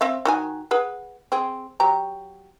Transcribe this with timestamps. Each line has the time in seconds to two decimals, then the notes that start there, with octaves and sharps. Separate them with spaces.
0.01 C4 E5 F5
0.25 D#3 F#4 G#5
0.71 G#4 B4 F#5
1.32 C4 G#4
1.80 F#3 G4 A#5